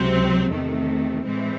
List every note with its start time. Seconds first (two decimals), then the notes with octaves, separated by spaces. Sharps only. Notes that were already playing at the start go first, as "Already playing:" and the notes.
Already playing: C#2 C3 F#3 C4
0.51 E2 C3 D#3 A3
1.25 A2 E3 G#3 C4